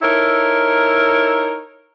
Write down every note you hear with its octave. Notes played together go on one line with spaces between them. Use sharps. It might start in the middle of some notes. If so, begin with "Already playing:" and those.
D#4 E4 A4 A#4 C#5